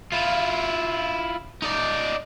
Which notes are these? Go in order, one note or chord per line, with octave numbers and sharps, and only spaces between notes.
E4 F4
D#4 D5